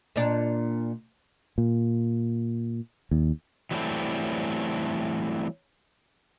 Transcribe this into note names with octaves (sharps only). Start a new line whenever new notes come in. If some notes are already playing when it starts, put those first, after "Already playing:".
A#2 D4
A#2
D#2
E3 F#3 G3 A3 C4 E4